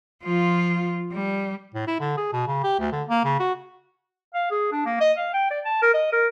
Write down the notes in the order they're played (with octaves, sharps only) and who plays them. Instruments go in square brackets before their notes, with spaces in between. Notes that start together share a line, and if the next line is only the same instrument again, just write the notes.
[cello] F3 F4
G3
[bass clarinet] A2
E4
D3
G#4
B2
C#3
G4
D2
D3
A#3
C#3
F#4
[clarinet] F5
G#4
D4
A#3
D#5
F5
G5
D5
A5
A#4
D#5
A#4